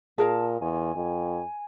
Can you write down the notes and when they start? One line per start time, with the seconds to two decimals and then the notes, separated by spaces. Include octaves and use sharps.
0.18 A#2 G#4 A#4 F5 A5
0.61 E2 G#5
0.96 F2